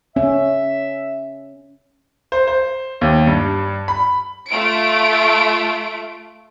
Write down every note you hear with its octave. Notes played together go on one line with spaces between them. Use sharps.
C#4 E5
C5
C5
D#2
G2
B5
A3 F4 D7